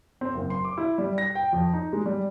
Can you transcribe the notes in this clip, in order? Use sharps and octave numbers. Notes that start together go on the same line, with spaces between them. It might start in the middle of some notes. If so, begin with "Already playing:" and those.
C4
F#1
C6
D6
E4
G3
A#6
G5
F2
D#4
G#3
G3